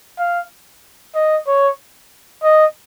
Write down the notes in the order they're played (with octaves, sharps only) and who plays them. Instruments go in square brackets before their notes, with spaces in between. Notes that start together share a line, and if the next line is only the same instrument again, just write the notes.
[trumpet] F5
D#5
C#5
D#5